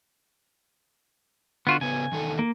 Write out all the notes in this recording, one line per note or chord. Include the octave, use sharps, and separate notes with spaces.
D3 B3 F4 F#4
C#3 B3 C#4 G#5
E2 D#3 A4
A#3